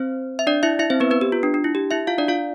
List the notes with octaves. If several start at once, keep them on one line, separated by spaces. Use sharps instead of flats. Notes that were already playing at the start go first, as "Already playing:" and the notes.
Already playing: C4 C5
E5
D4 D5
E4 E5
E4 E5
C4 C5
B3 B4
B3 B4
G4
F4
D4
D4
E4
G4
E4 E5
F4 F5
D4 D5
F4 F5